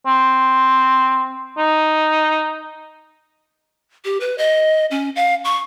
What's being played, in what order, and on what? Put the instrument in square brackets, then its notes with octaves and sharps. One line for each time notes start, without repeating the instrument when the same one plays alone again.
[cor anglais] C4
D#4
[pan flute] G4
B4
D#5
C#4
F5
C#6